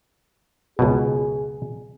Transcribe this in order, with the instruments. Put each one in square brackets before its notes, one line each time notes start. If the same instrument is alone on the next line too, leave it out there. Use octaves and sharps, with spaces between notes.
[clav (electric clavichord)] C#2 F#2 B2 [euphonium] G#4